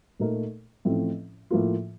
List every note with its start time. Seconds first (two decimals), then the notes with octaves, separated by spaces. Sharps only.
0.20 A#2 A3 D#4 A#4
0.85 A1 A2 F3 A3 C4
1.51 A2 F3 A#3 F4